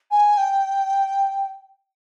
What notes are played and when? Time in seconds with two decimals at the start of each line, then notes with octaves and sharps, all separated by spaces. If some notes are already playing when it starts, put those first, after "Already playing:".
0.11 G#5
0.37 G5